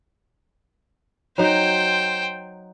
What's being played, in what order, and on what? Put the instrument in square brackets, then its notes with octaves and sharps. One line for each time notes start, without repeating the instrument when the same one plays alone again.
[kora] F#3 D#4 D#5 [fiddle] C5 G5